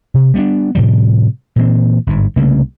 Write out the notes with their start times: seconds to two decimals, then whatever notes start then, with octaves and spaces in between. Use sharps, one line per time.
0.14 C3
0.34 G3 B3 C#4 D4
0.75 A2 C3 F3 G3
1.56 A#2 E3 C4
2.07 G1 G#2
2.36 C2 C#3 A3 A#3